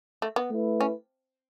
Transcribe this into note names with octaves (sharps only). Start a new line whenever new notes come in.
A3
B3
A3 E4 B4
C#4